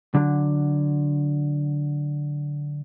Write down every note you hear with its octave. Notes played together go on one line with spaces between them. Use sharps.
D3 F#3